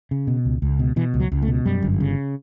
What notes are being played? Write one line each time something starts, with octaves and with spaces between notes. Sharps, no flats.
C#3
B2
C#2
C#2
B2
B2 E3
C#2
F#3
C#2
A3
B2
F#2 G3
G1
C#3